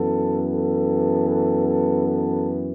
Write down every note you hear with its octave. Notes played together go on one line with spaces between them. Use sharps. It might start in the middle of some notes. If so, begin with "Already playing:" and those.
Already playing: F#2 E3 B3 A4
A4
A4
A4
A4